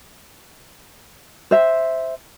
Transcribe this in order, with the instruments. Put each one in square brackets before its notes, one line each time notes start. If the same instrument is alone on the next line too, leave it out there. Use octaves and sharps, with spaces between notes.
[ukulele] C5 E5